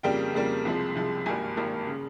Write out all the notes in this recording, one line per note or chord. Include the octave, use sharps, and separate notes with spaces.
F2 C#3 G3 A#3 G5
F2 C#3 G3 A#3
C2 C3 F3 G#3
C2 C3 F3 G#3
G#1 G2 G3 A#3 G#5
G#1 G2 G3 A#3
C#3